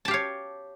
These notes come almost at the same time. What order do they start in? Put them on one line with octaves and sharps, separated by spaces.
A5 G4 F5 C#5